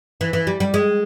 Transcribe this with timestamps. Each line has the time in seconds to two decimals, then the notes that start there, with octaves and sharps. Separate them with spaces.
0.21 E3
0.33 E3
0.47 G3
0.60 G3
0.74 G#3